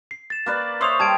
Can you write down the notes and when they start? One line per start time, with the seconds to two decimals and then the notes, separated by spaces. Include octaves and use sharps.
0.11 C7
0.30 A6 E7
0.46 A#3 B4 D5
0.81 C5 C#5 E5 C6 D#6 F7
1.00 G3 A5 G#6 D7